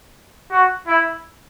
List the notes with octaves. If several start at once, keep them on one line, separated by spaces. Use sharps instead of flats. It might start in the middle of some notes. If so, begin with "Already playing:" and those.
F#4
E4